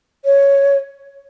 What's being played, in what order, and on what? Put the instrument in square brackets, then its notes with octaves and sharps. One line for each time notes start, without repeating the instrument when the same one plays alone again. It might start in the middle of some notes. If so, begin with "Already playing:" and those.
[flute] C#5